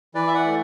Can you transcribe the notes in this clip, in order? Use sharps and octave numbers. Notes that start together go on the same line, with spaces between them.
E3 B4 D5
E5
D5 F#5
A3